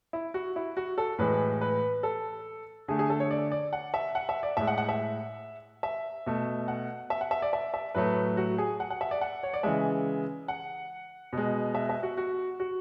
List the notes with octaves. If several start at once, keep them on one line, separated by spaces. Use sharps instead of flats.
E4
F#4
E4
F#4
A4
A2 E3 G#3 B4
B4
A4
D3 A3 G#4
G#4
A4
C#5
D5
D5
F#5
E5
F#5
E5
D5
A2 G#3 E5
F#5
F#5
E5
E5
B2 A3
F#5
E5
F#5
E5
D5
E5
E5
A2 F#3 A3 B4
F#4
G#4
F#5
F#5
E5
D5
F#5
C#5
D5
C#3 E3 G#3 E5
F#5
B2 G#3
E5
E5
F#4
F#4
F#4